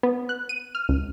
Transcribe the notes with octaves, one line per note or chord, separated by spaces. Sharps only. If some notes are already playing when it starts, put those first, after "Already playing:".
B3
F#6
D#7
F6
C#2